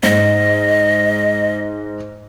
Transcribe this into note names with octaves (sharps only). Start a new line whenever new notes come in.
G#2 D#5